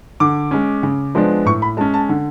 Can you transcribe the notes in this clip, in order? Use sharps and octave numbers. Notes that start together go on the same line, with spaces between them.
D3 D6
G#3 C#4
C#3
F3 G#3 B3 D4
A2 C#6
B5
G#3 C#4 A5
A5
D3